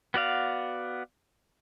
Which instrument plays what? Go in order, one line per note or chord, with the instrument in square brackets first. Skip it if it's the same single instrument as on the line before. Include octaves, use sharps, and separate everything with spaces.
[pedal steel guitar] B3 F#4 D5 F5